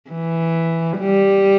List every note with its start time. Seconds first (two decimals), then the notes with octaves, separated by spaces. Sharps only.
0.10 E3
0.98 G3